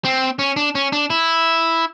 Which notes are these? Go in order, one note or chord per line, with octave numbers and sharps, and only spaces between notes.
C4
C#4
D4
C#4
D4
E4